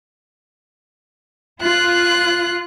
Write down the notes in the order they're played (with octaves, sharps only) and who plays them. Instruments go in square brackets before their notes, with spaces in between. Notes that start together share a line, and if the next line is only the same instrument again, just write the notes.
[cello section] F4 [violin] F#6